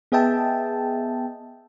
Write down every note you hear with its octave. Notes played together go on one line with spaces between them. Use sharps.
B3 G#4 D#5 E5 G5 A5